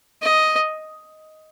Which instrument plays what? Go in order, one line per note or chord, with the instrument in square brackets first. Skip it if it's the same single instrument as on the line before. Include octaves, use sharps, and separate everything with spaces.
[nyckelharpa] D#5